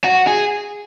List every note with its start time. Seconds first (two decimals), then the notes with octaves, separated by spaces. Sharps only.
0.04 F#4
0.27 G#4